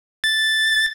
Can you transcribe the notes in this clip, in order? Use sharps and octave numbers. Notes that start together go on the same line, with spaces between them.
A6